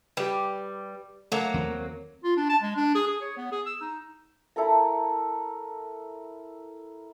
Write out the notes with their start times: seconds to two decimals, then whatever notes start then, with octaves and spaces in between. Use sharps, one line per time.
0.17 G3 G4 B4
1.32 F#3 A3 A#3 A#4
1.54 D#2 C4
2.24 F4
2.37 D4
2.49 A5
2.62 G#3
2.76 D4
2.95 G#4
3.08 G#4
3.21 C#5
3.37 B3
3.52 G#4
3.66 E6
3.81 D#4
4.56 E4 A4 A#4 A#5